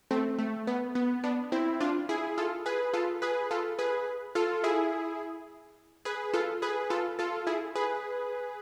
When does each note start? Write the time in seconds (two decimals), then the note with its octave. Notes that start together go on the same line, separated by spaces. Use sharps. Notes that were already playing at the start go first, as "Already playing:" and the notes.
0.11 A3 C4
0.39 A3
0.67 B3
0.95 B3
1.24 B3 D4
1.52 C4 E4
1.80 D4 F4
2.09 E4 G#4
2.38 F4 A4
2.66 G#4 B4
2.94 F4 A4
3.22 G#4 B4
3.51 F4 A4
3.79 G#4 B4
4.35 F4 A4
4.64 E4 G#4
6.05 G#4 B4
6.33 F4 A4
6.62 G#4 B4
6.90 F4 A4
7.19 F4 A4
7.47 E4 G#4
7.75 G#4 B4